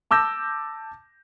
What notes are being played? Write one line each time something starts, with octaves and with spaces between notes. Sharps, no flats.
A5 D6 E6 G6 A#6